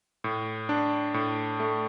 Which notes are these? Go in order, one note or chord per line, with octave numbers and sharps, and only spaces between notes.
A2
D4
A2
A3